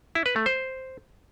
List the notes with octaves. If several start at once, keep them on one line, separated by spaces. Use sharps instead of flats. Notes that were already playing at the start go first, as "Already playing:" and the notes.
E4
B4
A3
C5